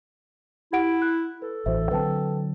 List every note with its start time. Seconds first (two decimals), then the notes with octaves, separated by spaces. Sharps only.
0.73 E4 G4 F#5 D7
1.02 F#6
1.42 A4 B4
1.66 A1 E3 F#4 C5 E5
1.91 D3 F#3 C4 B4 G5 A5